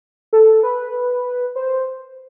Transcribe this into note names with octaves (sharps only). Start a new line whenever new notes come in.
A4
B4
C5